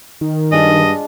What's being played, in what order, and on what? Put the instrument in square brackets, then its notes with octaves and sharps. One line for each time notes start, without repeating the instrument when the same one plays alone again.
[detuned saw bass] D#3
[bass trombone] G2 [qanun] G#3 D4 F4 [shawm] D#5